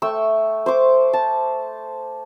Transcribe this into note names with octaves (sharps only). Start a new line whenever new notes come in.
A3 G5 C#6 E6
C5 C#6 D6
A5